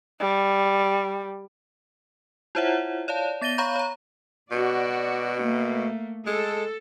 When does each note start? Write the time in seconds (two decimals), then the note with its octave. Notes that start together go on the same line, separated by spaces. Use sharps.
0.20 G3
2.55 E4 F4 C5 C#5 E5 F#5
3.08 C#5 D5 F5 A5
3.41 B3 A6 A#6 D#7 G7
3.58 C#5 F5 A#5 B5 C#6 G6
3.76 C#5 A#5
4.51 B2 F#4 D5
5.42 A3 A#3
6.27 G#3 A4